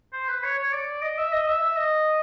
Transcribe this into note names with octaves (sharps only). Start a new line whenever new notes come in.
C5
B4
C#5
C#5
D5
D#5
E5
D#5
E5
E5
D#5